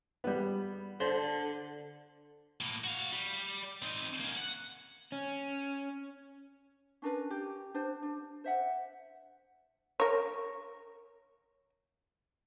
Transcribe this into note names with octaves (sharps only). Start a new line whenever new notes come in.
G3 B3
D3 C5
A2 A#3
F#4 F5
G3
C4 D#4
A#3 C#4
F#5
C#4
C#4 D4 A#4 B4
G4
D4 C5
D4
C5 E5 F#5
A#4 C#5